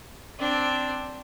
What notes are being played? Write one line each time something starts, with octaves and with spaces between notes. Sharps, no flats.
C4 D4